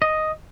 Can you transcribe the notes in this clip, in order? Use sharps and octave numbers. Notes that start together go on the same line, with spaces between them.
D#5